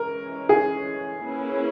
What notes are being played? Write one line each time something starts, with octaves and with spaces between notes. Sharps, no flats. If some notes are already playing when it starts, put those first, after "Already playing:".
Already playing: E3 G#3 C#4 A#4
G#4
A#3 C#4 E4 G#4 B4